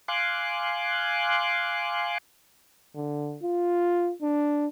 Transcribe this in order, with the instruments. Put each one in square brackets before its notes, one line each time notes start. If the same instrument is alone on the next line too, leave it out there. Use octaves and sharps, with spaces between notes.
[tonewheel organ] F5 G#5 C6 D6 F#6
[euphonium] D3
F4
D4